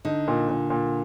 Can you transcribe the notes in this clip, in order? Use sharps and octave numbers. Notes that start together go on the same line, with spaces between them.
D3 D#4
A#2
A#2
A#2